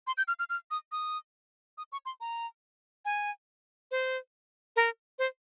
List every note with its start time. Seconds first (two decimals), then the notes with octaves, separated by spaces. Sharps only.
0.07 C6
0.18 G6
0.28 F6
0.39 F6
0.49 F6
0.71 D#6
0.92 D#6
1.78 D#6
1.92 C#6
2.06 C6
2.21 A#5
3.05 G#5
3.91 C5
4.76 A#4
5.19 C5